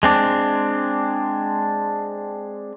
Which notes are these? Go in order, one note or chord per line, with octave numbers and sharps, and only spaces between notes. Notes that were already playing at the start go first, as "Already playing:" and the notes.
G#3 C4 D4